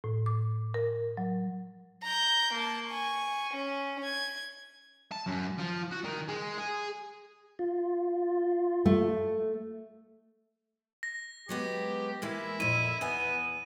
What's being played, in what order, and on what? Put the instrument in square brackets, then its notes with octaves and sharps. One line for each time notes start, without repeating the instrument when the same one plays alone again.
[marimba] A2
D6
A#4
F#3
[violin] A#5 G6
A#3 A5
G#5 C#6
C#4
G#6
[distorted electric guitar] A5
F#2
F3
F#4
D#3
G#3
G#4
[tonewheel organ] F4
[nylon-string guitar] A3
[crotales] A#6
[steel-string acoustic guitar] F#3 G#3 B3 [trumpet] G4
[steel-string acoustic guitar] E3 G#3 A#3 [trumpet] E4
[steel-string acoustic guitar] F2 A#2 [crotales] D#7
[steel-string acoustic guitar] E2 G#5 [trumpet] B3